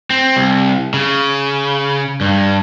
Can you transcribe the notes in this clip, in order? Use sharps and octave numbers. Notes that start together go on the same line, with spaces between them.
C4
C2
C#3
G2